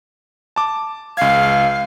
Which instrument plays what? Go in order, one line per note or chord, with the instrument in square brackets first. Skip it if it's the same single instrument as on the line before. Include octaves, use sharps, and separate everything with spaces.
[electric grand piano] A5 D6
[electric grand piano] C#2 G#6 [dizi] F5